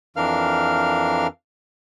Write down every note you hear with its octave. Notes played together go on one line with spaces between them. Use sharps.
F2 E3 D4 A#4 F5 F6